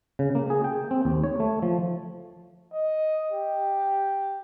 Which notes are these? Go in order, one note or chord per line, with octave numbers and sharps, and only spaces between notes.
C#3
A#3
G#4
G5
C4
D#2
C#5
A3
F3
D#5
G4